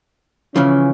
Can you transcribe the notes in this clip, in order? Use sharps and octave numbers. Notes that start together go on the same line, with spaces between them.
C#3 E3 F3 C#4